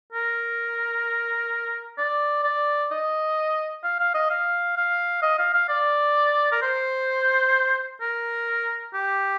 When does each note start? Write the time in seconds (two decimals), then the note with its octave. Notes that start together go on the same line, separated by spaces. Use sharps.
0.13 A#4
1.98 D5
2.44 D5
2.92 D#5
3.84 F5
3.99 F5
4.15 D#5
4.30 F5
4.77 F5
5.23 D#5
5.39 F5
5.54 F5
5.69 D5
6.52 A#4
6.62 C5
8.01 A#4
8.94 G4